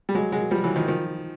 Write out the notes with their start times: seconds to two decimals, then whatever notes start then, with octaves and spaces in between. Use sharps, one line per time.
0.09 G3
0.15 F#3 G#3
0.32 F#3 G#3
0.51 F3 G3
0.64 E3 F#3
0.76 D#3 F3
0.88 D#3 F3